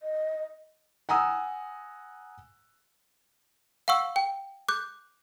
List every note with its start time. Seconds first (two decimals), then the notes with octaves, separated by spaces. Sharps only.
0.01 D#5
1.09 F#5 G#5 A#5 D#6 E6
3.88 F5 F#5 C#6 E6
4.16 G5
4.68 D6 F#6 G6